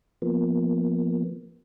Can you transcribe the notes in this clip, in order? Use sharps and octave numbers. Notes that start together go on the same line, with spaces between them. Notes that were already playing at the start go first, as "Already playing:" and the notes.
F3 A#3 B3